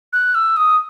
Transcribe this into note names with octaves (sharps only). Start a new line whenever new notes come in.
F#6
E6
D#6